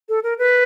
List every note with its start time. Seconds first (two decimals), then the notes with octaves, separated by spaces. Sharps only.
0.09 A4
0.24 A#4
0.38 B4